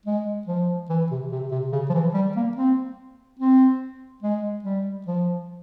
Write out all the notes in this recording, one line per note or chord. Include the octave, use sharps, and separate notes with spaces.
G#3
F3
E3
C3
C3
C3
C#3
F3
E3
G3
A#3
C4
C4
G#3
G3
F3